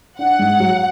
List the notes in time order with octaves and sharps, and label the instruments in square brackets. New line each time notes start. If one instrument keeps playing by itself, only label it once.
[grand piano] D4 [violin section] F#5
[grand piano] G#2
F#3